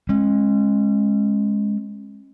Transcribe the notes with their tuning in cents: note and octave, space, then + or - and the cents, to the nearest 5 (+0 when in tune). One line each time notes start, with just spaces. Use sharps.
G#3 +0 C#4 -30